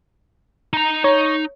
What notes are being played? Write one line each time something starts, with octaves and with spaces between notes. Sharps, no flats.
D#4 A#5
D#4 C#5